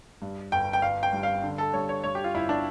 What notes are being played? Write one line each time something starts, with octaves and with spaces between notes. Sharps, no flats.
G2
G1 G5
G5
G1 F5
G5
G2
F5
D3
A4
G2 C#5
C#5
G2 C#5
G4
F4
G1 E4
D4